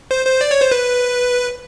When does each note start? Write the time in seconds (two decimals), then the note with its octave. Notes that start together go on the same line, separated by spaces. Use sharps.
0.11 C5
0.26 C5
0.41 D5
0.51 C#5
0.61 C5
0.72 B4